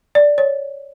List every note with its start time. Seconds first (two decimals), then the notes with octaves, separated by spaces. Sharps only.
0.15 D5
0.38 C#5